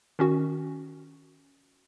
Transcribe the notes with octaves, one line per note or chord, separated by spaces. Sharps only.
D#3 C#4 F#4